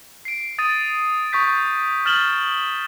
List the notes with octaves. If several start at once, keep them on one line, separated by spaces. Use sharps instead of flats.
C7 D7
D#6 A6 D#7
C#6 D#6 G6 B6
D#6 F6 A6 E7 F#7 G7